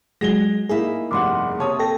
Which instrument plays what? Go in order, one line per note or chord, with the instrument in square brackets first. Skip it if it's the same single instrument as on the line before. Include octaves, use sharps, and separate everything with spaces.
[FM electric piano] F#3 G#3 [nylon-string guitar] F#4 G#4 [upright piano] A#6 G7
[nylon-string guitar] A#3 D#4 E4 [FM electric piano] G#4
[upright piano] F1 G2 F#5 [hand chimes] C6 D6
[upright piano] C3 C#5 D#6 [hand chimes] A#3 A5
[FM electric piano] A4 A#6 [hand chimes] G5